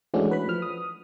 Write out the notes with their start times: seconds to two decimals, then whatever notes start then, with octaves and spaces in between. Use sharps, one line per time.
0.14 E3 G#3 A3 C#4 D4 F#4
0.31 B4 B5
0.48 F3 F6
0.62 D#6